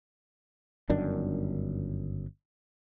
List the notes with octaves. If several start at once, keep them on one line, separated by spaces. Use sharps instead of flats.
G1 F#2 D#3 D4